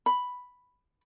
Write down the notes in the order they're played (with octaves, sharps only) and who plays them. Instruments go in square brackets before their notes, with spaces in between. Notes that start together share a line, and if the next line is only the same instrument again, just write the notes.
[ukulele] B5